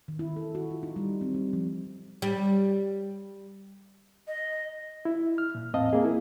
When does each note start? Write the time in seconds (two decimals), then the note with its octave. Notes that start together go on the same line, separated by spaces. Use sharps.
0.08 D#3
0.19 E4
0.36 A4
0.55 F#4
0.70 F4
0.83 D#4
0.96 G3
1.21 C4
1.34 G3
1.53 F3
2.22 G3
4.27 D#5
5.05 E4
5.38 F6
5.55 A#2
5.73 E2 A2 C4 D#5 F5 A5
5.93 A#3 C4 G#4
6.04 E4